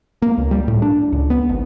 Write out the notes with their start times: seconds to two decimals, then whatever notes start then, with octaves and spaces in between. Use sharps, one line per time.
0.22 A#3
0.38 C#2
0.51 G3
0.68 A2
0.82 D4
1.13 C#2
1.30 B3
1.49 G#1